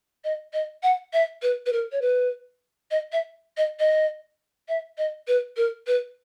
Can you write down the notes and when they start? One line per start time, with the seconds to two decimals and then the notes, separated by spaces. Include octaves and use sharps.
0.24 D#5
0.53 D#5
0.83 F#5
1.13 E5
1.42 B4
1.66 B4
1.73 A#4
1.92 C#5
2.02 B4
2.91 D#5
3.12 E5
3.57 D#5
3.79 D#5
4.69 E5
4.98 D#5
5.28 B4
5.57 A#4
5.87 B4